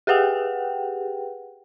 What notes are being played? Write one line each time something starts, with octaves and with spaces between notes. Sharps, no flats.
G4 G#4 B4 F#5 G5